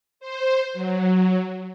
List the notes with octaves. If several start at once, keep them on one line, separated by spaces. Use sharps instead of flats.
C5
F#3